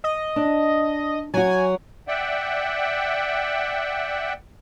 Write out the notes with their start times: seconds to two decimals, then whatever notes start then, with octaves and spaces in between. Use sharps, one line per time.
0.04 D#5
0.36 D4
1.34 F#3 F#4 G#5
2.08 D5 E5 F#5 G5